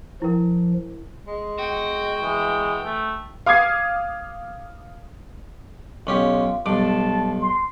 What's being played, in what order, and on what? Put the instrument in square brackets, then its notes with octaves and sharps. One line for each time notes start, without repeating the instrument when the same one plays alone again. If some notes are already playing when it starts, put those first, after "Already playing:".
[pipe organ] F3 [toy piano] E4 A#4
[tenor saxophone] G#3
[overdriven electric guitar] F#4 [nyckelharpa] G5
[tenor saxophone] E3 [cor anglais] G#3
[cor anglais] A3
[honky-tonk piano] F5 D6 D#6 G#6 C7
[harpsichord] B1 C#4 G4 [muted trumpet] F4
[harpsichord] B1 G2 D6 [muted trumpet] A5
[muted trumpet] C6